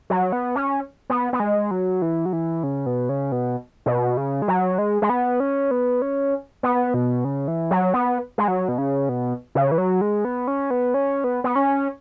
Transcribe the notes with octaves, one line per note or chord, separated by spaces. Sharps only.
F#3
B3
C#4
B3
B3
G#3
F#3
E3
F#3
E3
C#3
B2
C#3
B2
B2
C#3
G#3
F#3
G#3
G#3
B3
C#4
B3
C#4
B3
B2
C#3
E3
F#3
B3
G#3
F#3
B2
C#3
B2
C#3
E3
F#3
G#3
B3
C#4
B3
C#4
B3
B3
C#4